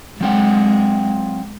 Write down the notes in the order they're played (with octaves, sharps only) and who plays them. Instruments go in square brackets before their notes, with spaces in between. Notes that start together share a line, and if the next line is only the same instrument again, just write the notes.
[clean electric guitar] F#3 C4 F#5 [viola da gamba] G#3